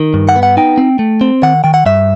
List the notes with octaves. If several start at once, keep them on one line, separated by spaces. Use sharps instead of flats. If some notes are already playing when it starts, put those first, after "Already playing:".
Already playing: D#3
G2
F#5
B3
F#5
D#4 G5
C4
A3
C4
D#3 F#5
D#3 G5
F#5
G2 E5